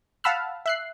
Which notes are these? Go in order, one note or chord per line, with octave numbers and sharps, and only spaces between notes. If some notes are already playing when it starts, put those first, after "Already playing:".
F5 F#5 A5 B5 E6 F6
E5 F#6 C7